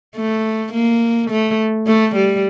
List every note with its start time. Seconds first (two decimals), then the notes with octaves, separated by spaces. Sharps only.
0.17 A3
0.73 A#3
1.31 A3
1.87 A3
2.15 G3